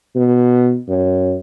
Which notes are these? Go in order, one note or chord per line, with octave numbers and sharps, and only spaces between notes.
B2
F#2